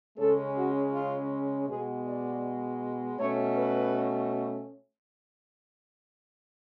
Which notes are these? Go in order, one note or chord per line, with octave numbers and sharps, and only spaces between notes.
C#3 G#3 C#4 A4
F#4
F4
B2 G#3 B3 G#4
D5
B2 A3 C#4 C#5
B4